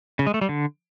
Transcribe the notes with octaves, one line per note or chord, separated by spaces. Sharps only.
C#3
G#3
A3
G3
D3